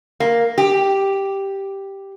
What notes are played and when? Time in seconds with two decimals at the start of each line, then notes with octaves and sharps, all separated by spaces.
0.20 A#3
0.58 G4